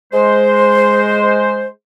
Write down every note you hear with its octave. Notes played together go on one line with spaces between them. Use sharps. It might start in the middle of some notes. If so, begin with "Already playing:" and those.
G#3 C5